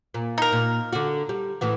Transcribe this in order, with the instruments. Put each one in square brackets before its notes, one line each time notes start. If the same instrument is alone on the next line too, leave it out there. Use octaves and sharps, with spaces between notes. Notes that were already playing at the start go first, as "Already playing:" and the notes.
[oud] A#2
[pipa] D#4 A#4
[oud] A#2
D3 F#4
G3
A2 E3 F#4